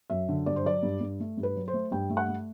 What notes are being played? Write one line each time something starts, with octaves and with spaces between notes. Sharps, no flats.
F#2 E5
D3
G2 D5
C5
F#3 D5
G2
G2
A3
G2
B4
F#3
C5
A3
G2 G5
A3
F#5
A3